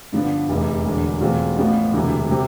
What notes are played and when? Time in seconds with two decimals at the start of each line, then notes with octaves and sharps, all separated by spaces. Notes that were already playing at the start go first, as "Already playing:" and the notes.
0.12 G2 D3 F3 B3 D4
0.49 F1 E2 C3
0.85 E1 E2 D3
1.21 E2 B2 A3 C4 F4
1.57 A1 A2 F3 B3 F4
1.93 E1 D2 C3 E3
2.30 C3 G3 C4 G4